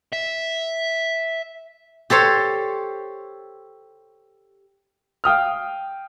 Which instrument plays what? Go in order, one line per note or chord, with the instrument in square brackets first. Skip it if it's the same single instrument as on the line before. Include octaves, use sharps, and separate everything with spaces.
[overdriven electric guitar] E5
[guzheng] G4 A4 C5 C#5
[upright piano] F5 G5 D#6 F6